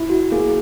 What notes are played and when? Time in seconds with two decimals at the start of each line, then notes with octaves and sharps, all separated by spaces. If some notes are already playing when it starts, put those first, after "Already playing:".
Already playing: E4
0.10 F#4
0.32 A#3 G#4